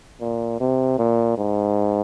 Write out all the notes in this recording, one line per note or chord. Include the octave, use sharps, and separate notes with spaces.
A#2
C3
A#2
G#2